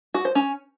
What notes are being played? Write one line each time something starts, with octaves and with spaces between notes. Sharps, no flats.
F#4
C5
C#4